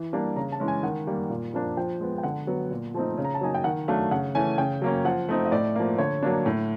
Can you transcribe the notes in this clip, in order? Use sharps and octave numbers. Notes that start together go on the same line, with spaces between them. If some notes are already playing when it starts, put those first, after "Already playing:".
Already playing: E3
G3 A#3 D4
C#3 A#5
A5
E3 G#3 C#4
G#5
D#3 F#5
G3 A#3
A#2
F3 A#3 D4
F3 G5
G#3 B3
G5
D3 F#5
F#3 B3
A#2
F3 A3 C4 D#4
C#3
A#5
A5
F#3 A#3 D#4 G#5
G5
D#3 F#5
F#3 A3 D4 F5
C#3 F#5
E3 A3 C#4 G#5
C#3 G5
F#3 A#3 C#4
F3 F#5
A3 C4 D#4
D#5
A2 D5
F3 A#3
D3 C#5
F#3 A#3 D4
A2